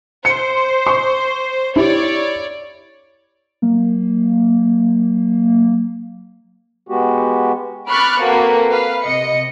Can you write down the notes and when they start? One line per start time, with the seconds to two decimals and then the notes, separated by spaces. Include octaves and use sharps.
0.25 C5 C#7
0.87 C#6
1.76 E4 G4 C#5 D5
3.62 F#3 A#3
6.88 G#3 B3 F#4 G4
7.89 B5 C#6 D6 F6 F#6 A6
8.23 A#3 C4 F#4 A4 B4
8.70 B4 F5
9.03 C3 D#5 C#7